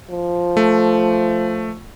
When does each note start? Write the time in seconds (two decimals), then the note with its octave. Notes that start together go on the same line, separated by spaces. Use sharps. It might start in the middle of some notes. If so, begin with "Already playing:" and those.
0.10 F3
0.57 A3